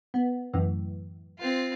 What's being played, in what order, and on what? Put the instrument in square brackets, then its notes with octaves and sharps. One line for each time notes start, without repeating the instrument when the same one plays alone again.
[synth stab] B3
F#2 A2 E3
[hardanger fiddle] C4 F4